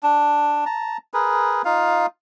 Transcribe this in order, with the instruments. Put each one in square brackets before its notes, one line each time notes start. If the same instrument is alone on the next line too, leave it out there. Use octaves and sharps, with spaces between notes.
[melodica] D4
A5 A#5
G#4 A#4 B4
D#4 F4 F5